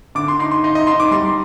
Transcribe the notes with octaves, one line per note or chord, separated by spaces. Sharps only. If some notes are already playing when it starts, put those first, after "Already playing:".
D3 D6
C6
D#4 C6
C6
D#4 D#5
D#5
D#4 C6
D6
G3 C6